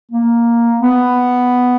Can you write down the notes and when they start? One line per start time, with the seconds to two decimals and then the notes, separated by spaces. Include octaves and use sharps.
0.11 A#3
0.80 B3